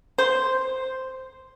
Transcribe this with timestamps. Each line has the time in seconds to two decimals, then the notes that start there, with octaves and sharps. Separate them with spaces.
0.18 C5